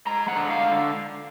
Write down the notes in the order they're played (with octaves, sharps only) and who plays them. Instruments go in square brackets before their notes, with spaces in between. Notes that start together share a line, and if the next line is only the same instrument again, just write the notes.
[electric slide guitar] G#3 A#5
F#5
D3
F5